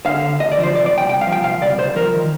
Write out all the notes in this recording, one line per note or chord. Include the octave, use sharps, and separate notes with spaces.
D3 F5
D2
D2 D#5
D5
F3
C5
C3 D5
D5
C2
G5
C2 G5
F5
F3
G5
C3 F5
C2 D5
C2 C5
F3 A#4
D#3